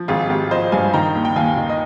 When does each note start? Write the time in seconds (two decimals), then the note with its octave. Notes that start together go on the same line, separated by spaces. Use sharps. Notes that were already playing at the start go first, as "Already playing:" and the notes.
Already playing: F3
0.08 G#1 F4 G#4
0.30 G#1 G4
0.51 F3 C5 D#5
0.72 G2 F5 G#5
0.94 D#3 G5 A#5
1.15 D#2
1.25 G5
1.36 D#2 F5 G#5
1.57 D#3
1.69 D#5